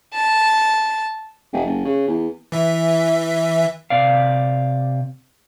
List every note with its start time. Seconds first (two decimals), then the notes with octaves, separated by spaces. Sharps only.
0.14 A5
1.53 F1
1.65 F#1
1.85 C#3
2.08 E2
2.52 E3 E5
3.90 C3 D5 F5